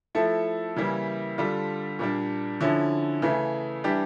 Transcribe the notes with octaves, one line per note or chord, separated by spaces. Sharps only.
F3 A3 E4 A4
C#3 E3 G3 A#3 E4
D3 G3 D4 F4 A4
A#2 G3 A#3 D4
D3 F3 C#4 E4
C#3 E3 A3
E3 G3 D4 G4